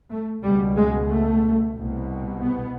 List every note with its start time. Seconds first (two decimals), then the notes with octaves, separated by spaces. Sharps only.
0.10 A3
0.43 C#2 B2 G3
0.76 G#3
1.09 A3
1.76 C2 B2
2.42 B3